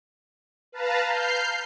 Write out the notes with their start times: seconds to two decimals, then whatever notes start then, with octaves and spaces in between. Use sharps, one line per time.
0.72 B4 F5 A5 A#5
1.05 F6 G6 C7